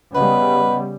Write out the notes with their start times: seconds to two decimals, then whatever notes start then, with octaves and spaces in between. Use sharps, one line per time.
0.15 C#3 G3 B3 B4 D#5 F#5 B5